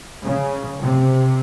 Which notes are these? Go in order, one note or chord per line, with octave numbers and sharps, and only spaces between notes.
C#3
C3